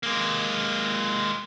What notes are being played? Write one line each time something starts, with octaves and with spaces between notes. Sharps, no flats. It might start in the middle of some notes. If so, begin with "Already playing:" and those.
G#3 A#3